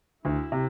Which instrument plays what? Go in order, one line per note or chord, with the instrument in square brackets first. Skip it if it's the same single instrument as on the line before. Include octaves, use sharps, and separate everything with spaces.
[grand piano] D2 [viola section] E4
[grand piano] C3